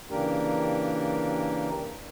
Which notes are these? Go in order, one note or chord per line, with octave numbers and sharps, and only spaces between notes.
C#3 E3 A#3 D4 G4 A#4